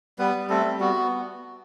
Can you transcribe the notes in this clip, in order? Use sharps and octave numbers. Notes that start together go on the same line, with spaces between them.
G3 B3 B4
G3
A3 C4 A4
G3
B3 F#4
B3